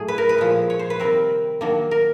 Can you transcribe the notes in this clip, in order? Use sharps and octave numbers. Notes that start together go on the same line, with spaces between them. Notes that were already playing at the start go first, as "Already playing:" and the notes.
Already playing: A2 F#3 A3 G#4
B4
A#4
B4
A#2 F3 G#3
C#5
C5
B4
C3 D#3 G3 C4 A#4
D#3 F#3 A#3 D4
A#4